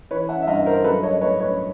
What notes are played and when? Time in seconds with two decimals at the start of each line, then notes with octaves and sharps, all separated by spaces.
0.11 E3 B4 C#5
0.29 E5 F#5
0.43 E5
0.47 G2 D#5 F5
0.66 A#4 C5
0.84 F#3 A4 B4
1.03 C#5 D#5
1.21 A2 B4 C#5
1.40 B4 C#5